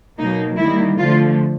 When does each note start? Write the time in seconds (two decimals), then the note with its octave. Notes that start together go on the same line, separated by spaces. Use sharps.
0.18 B2 F#3 A#3 D#4
0.58 D#3 G3 A#3 E4
0.98 D3 F3 A3 F4